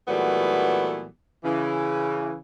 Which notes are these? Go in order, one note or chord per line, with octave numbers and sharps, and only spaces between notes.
A#2 E3 F#3 G3 A3 B3
C#3 E3